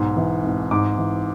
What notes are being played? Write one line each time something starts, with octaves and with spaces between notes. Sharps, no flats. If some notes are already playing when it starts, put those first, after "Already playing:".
Already playing: B1 G#2
E3
G#1
G#2 D6
E3